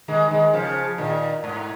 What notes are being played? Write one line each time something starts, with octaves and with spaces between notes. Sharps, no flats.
D#3 G#3
D#3 G#3
C#3 F3
A#2 D#3
G#2